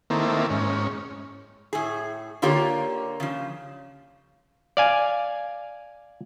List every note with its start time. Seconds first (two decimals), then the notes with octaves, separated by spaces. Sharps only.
0.10 D#3 A3 A#3 C4 E4
0.50 G#2 C#4
1.73 A2 G#4
2.42 D3 A#3 F4 G4 C#5
3.20 C#3 F3
4.77 D5 F5 G#5